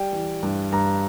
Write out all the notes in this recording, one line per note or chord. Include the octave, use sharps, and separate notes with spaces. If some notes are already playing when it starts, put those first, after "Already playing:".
Already playing: G3 G5
E3
G2
G2 A#5